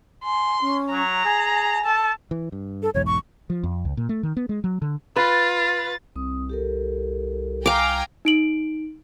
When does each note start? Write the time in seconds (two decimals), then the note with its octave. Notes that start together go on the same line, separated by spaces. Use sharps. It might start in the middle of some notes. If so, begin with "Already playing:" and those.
0.24 G#5 C6
0.61 C#4
0.92 F#3 A#5
1.25 G#4 G#5
1.85 A4 A5
2.31 E3
2.52 G2
2.83 A4
2.94 B1 E2 G#2 C#5
3.06 C#6
3.50 F3
3.64 F2
3.85 C#2
3.97 A#2
4.09 A3
4.23 D#3
4.37 B3
4.49 G#3
4.64 F#3
4.82 D3
5.16 F4 B4 A6
6.16 C2 C4 D#6
6.49 G4 A4 A#4
7.66 F5 G5 G#5 A#5 D6
8.25 D#4 D7 F#7